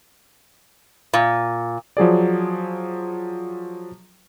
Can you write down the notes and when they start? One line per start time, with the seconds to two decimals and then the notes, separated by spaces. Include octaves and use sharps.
1.13 A#2
1.97 F3 F#3 G#4 D5